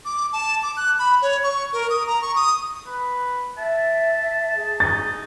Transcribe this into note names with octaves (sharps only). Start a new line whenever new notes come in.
D6
A5
D6
F#6
B5
C#5
C#6
A#4
D#6
A#5
C#6
D#6
B4
E5 A5
G#4
D#4 A6